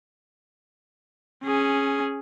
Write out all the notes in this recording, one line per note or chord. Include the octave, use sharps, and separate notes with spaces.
C#4 G#4